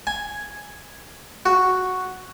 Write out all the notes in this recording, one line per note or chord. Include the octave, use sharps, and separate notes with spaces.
G#5
F#4